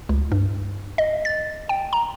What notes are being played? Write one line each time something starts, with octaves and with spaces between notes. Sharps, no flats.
C#2
G2
D#5
A6
G5
A#5